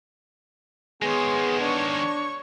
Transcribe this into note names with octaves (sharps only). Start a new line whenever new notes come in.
D#3 G#3 B3 G#4 C#5 C6
D4 C#5 C#6